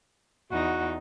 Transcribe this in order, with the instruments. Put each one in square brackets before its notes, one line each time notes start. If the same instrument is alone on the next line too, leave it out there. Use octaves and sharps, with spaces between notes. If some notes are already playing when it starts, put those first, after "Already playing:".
[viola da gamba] E2 D#4 [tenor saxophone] F#4